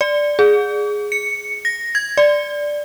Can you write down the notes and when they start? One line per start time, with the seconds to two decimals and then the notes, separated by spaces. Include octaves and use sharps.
0.01 D5
0.39 G#4
1.12 C#7
1.65 A#6
1.95 G#6
2.17 D5